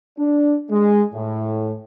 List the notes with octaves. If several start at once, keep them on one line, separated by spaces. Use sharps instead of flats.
D4
G#3
A2